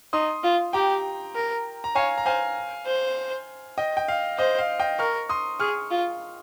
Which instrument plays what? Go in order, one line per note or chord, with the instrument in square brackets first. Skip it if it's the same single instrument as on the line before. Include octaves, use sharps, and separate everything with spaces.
[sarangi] D#4 [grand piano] C6 D#6
[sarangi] F4
[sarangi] G4 [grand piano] G5 A#5
[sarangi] A#4
[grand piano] A#5
[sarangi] C#5 [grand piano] F5 G#5
[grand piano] A#5
[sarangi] C5 [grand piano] F5 G#5
[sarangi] C5
[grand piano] D#5 G5
G5
F5
[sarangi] C5 [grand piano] D#5
[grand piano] F5
D#5 G5
[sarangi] A#4 [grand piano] C#6 F6
[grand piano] C6 D#6
[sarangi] G#4 [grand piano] C#6 F6
[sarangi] F4